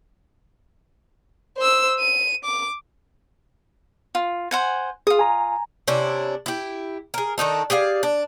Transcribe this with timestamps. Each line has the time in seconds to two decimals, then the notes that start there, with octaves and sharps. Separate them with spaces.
1.57 C5 E6
1.99 D#7
2.44 D6
4.15 F4
4.51 C5 F#5 G#5
5.07 F4 G#4 D#6
5.19 G#5 A#5
5.88 C3 C#4 D4 E4
6.46 E4 G4
7.14 G#4 A#4
7.38 D#3 D4 D#4 A4
7.70 G4 G#4 D5 F5
8.03 D4